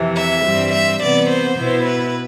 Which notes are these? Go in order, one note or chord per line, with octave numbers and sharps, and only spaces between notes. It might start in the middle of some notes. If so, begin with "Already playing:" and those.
Already playing: F2 C3 E3
E5
G2 E3 G3 C4
E5
C3 E3 B3 D5
C5
B2 B3 E4
B4